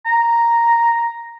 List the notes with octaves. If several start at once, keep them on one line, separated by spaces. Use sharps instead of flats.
A#5